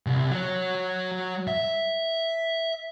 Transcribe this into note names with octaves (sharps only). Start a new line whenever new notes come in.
C2
F#3 C#5
E5